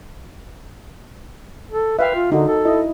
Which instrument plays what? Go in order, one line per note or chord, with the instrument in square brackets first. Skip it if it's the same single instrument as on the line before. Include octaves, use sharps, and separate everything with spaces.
[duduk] A4
[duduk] B4 [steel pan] E5 F5 G5
[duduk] F4
[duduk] D3 [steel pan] D#4 F#4
[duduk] A4
[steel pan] E4 D#5